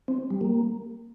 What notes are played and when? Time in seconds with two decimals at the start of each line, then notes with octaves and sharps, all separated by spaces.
0.08 C4
0.30 G3
0.41 A#3